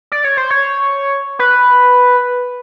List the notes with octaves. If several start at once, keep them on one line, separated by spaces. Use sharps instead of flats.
D5
C#5
C5
C#5
B4